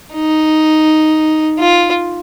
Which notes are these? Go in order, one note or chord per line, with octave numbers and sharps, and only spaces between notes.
D#4
F4